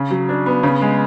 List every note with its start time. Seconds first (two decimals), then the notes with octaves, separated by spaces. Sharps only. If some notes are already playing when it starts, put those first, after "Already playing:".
Already playing: C#3
0.11 F#3
0.29 D4
0.46 B3
0.63 C#3
0.82 G#3